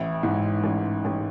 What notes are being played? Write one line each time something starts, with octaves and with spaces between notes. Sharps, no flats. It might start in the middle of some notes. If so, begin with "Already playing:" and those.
Already playing: A1 E4
G#2
A1
A1